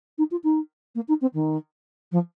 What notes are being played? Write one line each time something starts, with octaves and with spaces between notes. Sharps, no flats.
D#4
F4
D#4
A#3
D#4
C4
D#3
F3